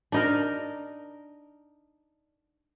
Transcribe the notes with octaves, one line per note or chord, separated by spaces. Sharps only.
D4 D#4 A#4